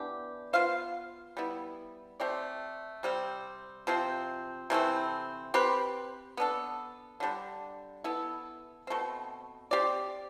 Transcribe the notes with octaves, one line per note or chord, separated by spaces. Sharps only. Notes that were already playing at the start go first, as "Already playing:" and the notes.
Already playing: E3 B3 D4 G4
B3 F4 C5 F5
G3 B3 E4
A3 C4 G4 D5
C3 G3 C4
C3 F3 C4
C3 E3 A3 C4
C4 G4 B4
B3 D4 A4
D3 G3 D4
B3 E4 A4
B2 A3 C4
C4 G4 D5